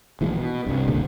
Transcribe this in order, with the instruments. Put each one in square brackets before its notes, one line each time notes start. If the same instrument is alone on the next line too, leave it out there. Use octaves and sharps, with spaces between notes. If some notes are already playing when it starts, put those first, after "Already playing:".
[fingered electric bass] A#1 E3 G#3
B2
C2 G2
F#1 C#2 A#2 D3